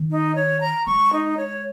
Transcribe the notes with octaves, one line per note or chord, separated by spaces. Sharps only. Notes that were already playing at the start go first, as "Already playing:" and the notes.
Already playing: D#3
D#4
C#5
A#5
G#3 C#6
D#4
C#5